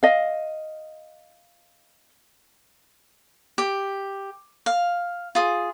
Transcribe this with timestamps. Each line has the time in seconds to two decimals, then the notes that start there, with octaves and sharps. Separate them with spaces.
0.03 D#5 F5
3.58 G4
4.66 F5
5.35 F4 G#4